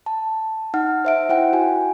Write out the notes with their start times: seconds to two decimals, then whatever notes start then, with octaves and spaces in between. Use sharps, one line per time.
0.06 A5
0.74 D#4 F#5 F6
1.05 C5 E5 D7
1.29 E4 C5 F#5 G5
1.53 F#4 G#5